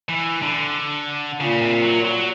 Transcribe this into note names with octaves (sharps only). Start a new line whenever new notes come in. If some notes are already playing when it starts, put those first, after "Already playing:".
E3
D3
A#2 C#3
C3
F#3
F#3